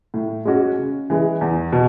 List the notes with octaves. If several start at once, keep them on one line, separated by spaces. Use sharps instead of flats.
A2
G#3 C#4 F#4
C#3
E3 G#3
E2
B2